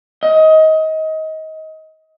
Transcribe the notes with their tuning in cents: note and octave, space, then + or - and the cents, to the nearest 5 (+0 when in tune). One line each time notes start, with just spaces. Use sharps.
D#5 +25